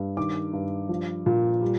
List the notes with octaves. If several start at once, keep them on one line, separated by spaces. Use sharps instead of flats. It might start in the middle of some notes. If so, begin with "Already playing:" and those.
Already playing: G2
D#3 D6
G2
F3
A#2
G3